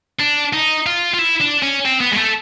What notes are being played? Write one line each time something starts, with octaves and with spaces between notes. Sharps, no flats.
D4
D#4
F4
F4
E4
D4
C#4
C4
B3
G#3
A3